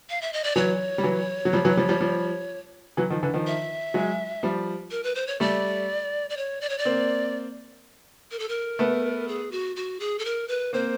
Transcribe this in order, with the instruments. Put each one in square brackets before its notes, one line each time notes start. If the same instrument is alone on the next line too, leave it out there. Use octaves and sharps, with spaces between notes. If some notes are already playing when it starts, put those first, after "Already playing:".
[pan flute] F5
E5
D#5
D5
[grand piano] E3 F#3 [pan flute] C#5
[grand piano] G3
E3 F#3
F#3
F3 G3
E3 F#3
F3 G3
F3 G3
F3 G3
E3 F#3
D#3 F3
D3 E3
D#3 F3
[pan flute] E5
[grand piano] F#3 G#3
F3 G3
[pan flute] A#4
B4
C5
C#5
[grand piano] G3 A3 [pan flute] D5
[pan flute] D5
C#5
D5
C#5
D5
[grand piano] A#3 C4
[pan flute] A#4
A4
A#4
[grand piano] A3 B3
[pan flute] G#4
F#4
F#4
G#4
A4
A#4
B4
[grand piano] A#3 C4 [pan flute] C5